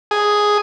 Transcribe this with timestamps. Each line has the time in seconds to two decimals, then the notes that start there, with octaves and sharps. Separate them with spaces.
0.11 G#4